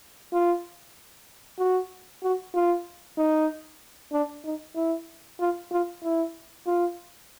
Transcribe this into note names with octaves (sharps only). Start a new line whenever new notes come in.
F4
F#4
F#4
F4
D#4
D4
D#4
E4
F4
F4
E4
F4